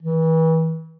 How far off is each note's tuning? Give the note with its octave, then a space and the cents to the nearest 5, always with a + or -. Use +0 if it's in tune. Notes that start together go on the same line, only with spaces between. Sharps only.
E3 -35